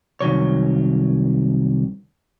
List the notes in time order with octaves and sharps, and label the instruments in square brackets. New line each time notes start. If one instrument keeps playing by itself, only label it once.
[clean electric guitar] C2 D#3 F#3 C#5